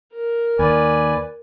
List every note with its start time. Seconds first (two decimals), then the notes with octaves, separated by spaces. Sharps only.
0.13 A#4
0.59 D#2 B4 D5 G#5